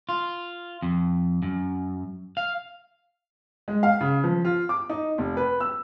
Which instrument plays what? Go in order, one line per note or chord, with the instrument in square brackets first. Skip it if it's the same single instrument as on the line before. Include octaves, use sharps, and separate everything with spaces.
[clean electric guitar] F4
F2
F#2
F5
[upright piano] G#3
F5
C#3
F3
F4
D6
D#4
F1
B4
E6